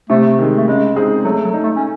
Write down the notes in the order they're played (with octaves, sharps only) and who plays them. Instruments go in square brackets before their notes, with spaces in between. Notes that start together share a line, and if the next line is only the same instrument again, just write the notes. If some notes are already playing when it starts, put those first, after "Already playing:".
[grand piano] C3 [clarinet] A3
[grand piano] D#3 G#3
[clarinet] A3
[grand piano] C#3 [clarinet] G#3
[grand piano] G#3 C4 D#4 G#4
[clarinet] F#3 [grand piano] A3
[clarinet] F#3
[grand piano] D#4 A4
[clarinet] A3
C#4